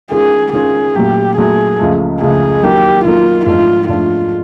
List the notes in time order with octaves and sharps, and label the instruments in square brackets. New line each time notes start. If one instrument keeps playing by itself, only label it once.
[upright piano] D#3 G#3 C#4 F4 A#4 [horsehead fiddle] G#4
[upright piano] D#3 G#3 C#4 F4 A#4 [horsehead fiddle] G#4
[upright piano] A#2 F#3 A3 [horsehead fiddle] G4
[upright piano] A#2 F#3 A3 [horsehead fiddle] G#4
[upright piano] C#2 C#3 F3 A3
[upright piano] C#2 C#3 F3 A3 [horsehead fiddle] G#4
[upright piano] D#3 F#3 A#3 [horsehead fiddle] G4
[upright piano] D#3 F#3 A#3 [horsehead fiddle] F4
[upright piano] G#2 F3 A3 D4 [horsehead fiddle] F4
[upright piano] G#2 F3 A3 D4 [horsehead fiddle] F4